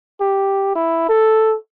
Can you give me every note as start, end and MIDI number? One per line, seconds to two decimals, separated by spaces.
0.21 0.71 67
0.75 1.08 64
1.09 1.56 69